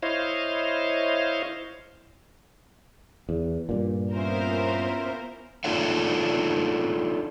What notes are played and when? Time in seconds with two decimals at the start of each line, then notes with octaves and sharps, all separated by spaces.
0.03 E4 C5 C#5 D#5 F5
3.29 E2
3.69 G2 A#2
4.12 B3 C#4 E4 F4 A#4 C5
5.64 D4 D#4 F4 A4 C#5 F5